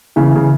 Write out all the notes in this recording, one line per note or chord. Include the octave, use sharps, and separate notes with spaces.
C#3 E3
C#3